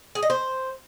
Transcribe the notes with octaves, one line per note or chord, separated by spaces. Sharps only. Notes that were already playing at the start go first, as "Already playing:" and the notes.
G#4
D#5
C5